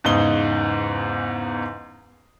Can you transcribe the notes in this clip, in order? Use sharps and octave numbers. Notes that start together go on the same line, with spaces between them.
E2 G#2 C#3 D#4 D#6 G7